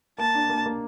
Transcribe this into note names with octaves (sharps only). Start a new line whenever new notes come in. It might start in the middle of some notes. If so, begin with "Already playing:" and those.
A#3 A5
D4
A#3
A#3